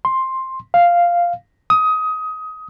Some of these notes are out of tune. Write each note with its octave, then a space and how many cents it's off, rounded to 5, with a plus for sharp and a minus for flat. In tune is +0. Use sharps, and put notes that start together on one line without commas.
C6 +10
F5 -5
D#6 +20